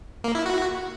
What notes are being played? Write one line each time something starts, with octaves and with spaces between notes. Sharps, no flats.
A#3
E4
F#4